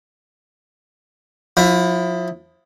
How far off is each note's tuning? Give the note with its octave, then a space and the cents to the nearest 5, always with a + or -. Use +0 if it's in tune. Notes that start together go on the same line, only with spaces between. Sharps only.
F3 +35 E4 +10